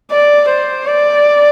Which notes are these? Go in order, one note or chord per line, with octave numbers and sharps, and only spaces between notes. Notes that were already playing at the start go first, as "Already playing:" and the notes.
D5
C5
D5